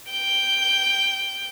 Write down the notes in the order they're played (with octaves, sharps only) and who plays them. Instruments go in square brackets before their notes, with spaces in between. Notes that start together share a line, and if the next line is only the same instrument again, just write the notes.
[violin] G5 G6